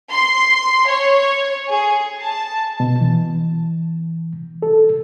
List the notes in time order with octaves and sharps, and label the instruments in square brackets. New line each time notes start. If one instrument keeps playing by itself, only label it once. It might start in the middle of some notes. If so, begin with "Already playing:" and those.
[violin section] C6
C#5
G#4
A5
[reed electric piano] B2
E3
A4